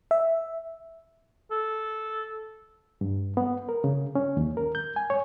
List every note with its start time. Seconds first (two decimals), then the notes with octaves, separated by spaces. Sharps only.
0.11 E5
1.51 A4
3.01 G2
3.37 B3
3.69 A#4
3.84 C#3
4.15 C#4
4.37 D#2
4.57 A#4
4.75 G6
4.96 G#5
5.10 C#5